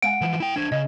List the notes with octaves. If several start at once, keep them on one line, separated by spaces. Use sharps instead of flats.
G#3 F5 F#5 G#5 D7
E3 F3
E4 G5
D4 C5 G#6
C#3 D#5